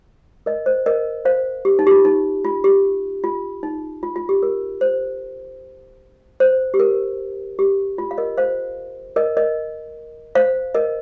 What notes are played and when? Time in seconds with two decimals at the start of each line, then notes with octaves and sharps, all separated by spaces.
0.46 A#4 D#5
0.66 C5
0.86 A#4 D#5
1.25 C5 F5
1.65 G4
1.79 D#4
1.87 G4
1.91 F4
2.05 D#4
2.45 F4
2.64 G4
3.24 F4
3.63 D#4
4.03 F4
4.16 F4
4.29 G4
4.43 A#4
4.81 C5
6.40 C5
6.74 G4
6.79 A#4
7.59 G4
7.98 F4
8.11 F5
8.18 A#4 D#5
8.38 C5 F5
9.16 A#4 D#5
9.37 A#4 D#5
10.35 C5 F5
10.75 A#4 D#5